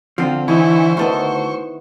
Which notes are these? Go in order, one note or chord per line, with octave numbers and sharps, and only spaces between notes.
D3 F3 C4 F4
E3 D#4 E4 C5 C#6
D2 D#3 B3 E4 A4 C#6